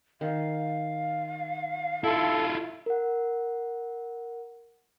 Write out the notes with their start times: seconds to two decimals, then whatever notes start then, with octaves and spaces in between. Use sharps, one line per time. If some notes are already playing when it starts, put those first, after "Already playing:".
0.21 D#3 F5
2.04 E4 F4 A4
2.86 A#4 F#5